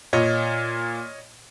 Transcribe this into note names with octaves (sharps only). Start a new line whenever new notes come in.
A#2 C#5 D#5